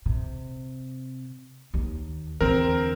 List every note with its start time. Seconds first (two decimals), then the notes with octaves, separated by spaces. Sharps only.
0.06 C3
1.74 D#2
2.41 E2 D3 C4 A#4